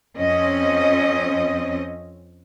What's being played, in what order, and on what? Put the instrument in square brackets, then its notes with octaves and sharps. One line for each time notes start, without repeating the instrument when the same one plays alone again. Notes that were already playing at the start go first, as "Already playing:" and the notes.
[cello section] F2 C4 C#4 D#5